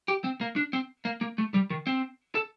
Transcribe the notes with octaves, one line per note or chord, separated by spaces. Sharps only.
G4
C4
A#3
D4
C4
A#3
A#3
A3
G3
D#3
C4
A4